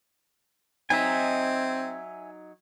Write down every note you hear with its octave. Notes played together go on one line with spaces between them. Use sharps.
F#3 C4 D#4 E5 G#5